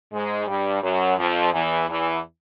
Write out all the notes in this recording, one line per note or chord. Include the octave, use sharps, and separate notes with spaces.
G#2 G#3
G2 G3
F#2 F#3
F2 F3
E2 E3
E2 E3